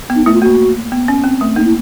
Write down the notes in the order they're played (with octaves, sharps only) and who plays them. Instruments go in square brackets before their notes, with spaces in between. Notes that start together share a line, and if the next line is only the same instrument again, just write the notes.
[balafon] B3
[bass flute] D#4
[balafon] A3 [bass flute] E4
[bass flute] F4
[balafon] A#3 [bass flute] F#4
[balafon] B3
C#4
C4
A3
[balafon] A#3 [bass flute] D#4
[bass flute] E4